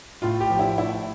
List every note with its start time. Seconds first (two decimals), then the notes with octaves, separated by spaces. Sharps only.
0.22 A2 F4
0.40 G4
0.50 F3
0.59 E4
0.78 A2 E4